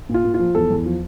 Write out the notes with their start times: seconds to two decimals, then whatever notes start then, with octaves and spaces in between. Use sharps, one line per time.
0.09 A#2
0.14 F4
0.25 A#2
0.34 F3 F4
0.55 E2 A4
0.70 E2
0.86 F3